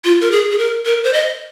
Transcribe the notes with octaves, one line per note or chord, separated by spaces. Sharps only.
F4
A#4
G#4
G#4
A#4
A#4
C5
D#5